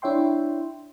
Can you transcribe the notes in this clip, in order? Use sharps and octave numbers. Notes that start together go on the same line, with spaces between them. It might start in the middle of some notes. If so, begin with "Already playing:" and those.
D4 E4 C#5 E5 G5 C6